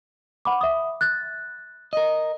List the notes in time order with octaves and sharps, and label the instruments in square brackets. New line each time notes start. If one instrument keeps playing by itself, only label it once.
[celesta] F#5 B5 D6
E5 D#6
F#6 A6
[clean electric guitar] A#4 D#5